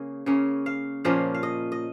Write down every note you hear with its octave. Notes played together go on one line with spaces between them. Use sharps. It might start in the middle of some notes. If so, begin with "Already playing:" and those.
Already playing: C#3 A#3 C#4 G#4
C#3 A#3 C#4
F5
A#2 F3 A#3 C#4 F5
F5
D#5
D#5